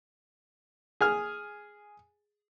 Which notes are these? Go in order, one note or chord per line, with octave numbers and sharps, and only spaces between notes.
G#4 G#5 F6